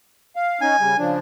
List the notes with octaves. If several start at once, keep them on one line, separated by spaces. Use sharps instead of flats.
F5
C#4 D#4 G#5
C#3 G3
C#3 F3 D4